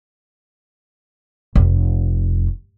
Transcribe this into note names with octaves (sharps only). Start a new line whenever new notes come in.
F1